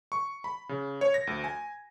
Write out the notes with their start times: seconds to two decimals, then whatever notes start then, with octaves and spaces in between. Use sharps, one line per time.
0.12 C#6
0.44 B5
0.69 C#3
1.01 C#5
1.14 A#6
1.27 D2
1.44 G#5